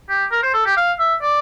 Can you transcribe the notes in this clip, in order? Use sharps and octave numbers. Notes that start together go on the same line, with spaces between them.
G4
A#4
C5
A4
G4
F5
E5
D5